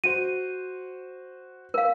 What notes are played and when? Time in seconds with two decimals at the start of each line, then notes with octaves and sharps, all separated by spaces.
0.04 F#4 C5 D#7
1.74 A#4 F5